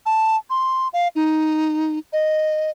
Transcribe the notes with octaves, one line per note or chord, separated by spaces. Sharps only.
A5
C6
F5
D#4
D#5